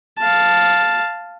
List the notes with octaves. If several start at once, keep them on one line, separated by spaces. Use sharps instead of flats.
F5 A5